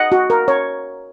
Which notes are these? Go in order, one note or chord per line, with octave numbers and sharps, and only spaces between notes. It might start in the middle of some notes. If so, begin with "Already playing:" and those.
Already playing: D#5 F#5
F#4
A#4
C#5